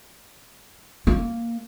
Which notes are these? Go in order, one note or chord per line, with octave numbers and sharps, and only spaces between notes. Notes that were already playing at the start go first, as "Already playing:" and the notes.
A#3